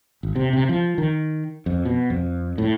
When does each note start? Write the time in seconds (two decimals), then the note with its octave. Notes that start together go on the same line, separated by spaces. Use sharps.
0.23 G#1
0.36 C3
0.53 C3
0.69 F3
0.98 D#3
1.66 F2
1.85 B2
2.10 F2
2.58 A2